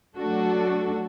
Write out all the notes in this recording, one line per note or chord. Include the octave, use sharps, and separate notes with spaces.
F#3 A3 D4 F#4 A4